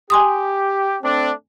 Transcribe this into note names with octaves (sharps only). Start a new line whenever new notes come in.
G4 G#5 C6 D#6
A3 C4 D4